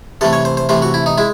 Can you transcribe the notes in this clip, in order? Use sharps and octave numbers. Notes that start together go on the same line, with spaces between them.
C3 E3 A3 A4
C#5
C5
C5
C3 E3 A3 C5
F#4
E4
D#4
G#3 E4